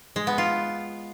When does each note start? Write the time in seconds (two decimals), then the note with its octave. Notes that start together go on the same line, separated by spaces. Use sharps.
0.16 G#3
0.27 B3
0.38 F4